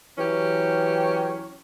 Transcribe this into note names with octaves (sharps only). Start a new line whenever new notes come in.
E3 F#3 C#4 G4